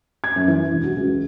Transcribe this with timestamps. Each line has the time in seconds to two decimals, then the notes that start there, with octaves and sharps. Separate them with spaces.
0.24 G#6
0.36 F#2
0.48 E3
0.71 E1
0.84 F#4
0.96 C#2